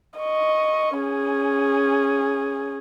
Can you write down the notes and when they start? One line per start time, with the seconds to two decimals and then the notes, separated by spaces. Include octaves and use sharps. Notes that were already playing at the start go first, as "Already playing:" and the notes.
0.20 D#5 C#6
0.98 C#4 G#4